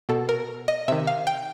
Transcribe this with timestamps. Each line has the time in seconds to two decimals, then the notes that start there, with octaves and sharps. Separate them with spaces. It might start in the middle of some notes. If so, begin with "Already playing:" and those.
0.09 B2 A4
0.29 A#4
0.68 D#5
0.88 C3 D#3 E5
1.07 F5
1.27 G5